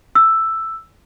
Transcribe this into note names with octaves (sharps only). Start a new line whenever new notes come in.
E6